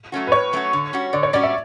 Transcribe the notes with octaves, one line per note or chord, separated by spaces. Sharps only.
F#3 A3 C#4 F#4
B4
A2 C#5
F#3 A3 C#4 F#4
D3
G3 C#4 F#4
D3 D5
C#5
G3 C#4 F#4 D5
E5